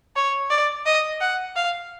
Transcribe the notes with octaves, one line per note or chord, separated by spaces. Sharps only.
C#5
D5
D#5
F#5
F5